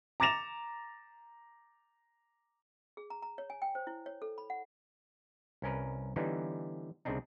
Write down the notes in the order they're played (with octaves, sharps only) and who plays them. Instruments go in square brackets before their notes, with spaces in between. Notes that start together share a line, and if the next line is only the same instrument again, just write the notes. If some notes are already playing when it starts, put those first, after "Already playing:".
[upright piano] A#5 D6 A6 A#6 E7 F7
[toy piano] G#4
A#5
A#5
C#5
G#5
G5
C5
E4
C#5
A4
B5
F#5
[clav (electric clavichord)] C2 C#4 A#4 B4
D3 E3 G3 B3 C#4 D#4
C2 C#3 C4 D4 D#4